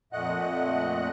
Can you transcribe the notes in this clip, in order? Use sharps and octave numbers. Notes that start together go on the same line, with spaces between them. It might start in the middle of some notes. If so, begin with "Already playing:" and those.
F2 A#2 A3 D#5 F#5 F#6